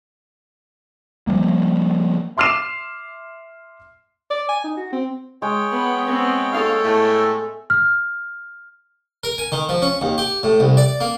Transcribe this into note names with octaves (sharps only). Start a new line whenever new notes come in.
F3 G3 A#3
E5 C6 D6 F6 C7 E7
D5
G#5
D#4
F#4
C4
G#3 C#5 G5
B3
B3 C4
D#2 A4 F5
A2 A3
F6
A#4
G#5
D#3
F3
C#4
D#2
G4
A2
C2
D5
A#3